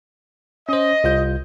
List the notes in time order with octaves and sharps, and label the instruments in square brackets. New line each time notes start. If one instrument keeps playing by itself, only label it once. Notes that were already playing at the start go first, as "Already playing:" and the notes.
[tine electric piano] C#4 C5 [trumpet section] D#5
[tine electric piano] C2 F4 G6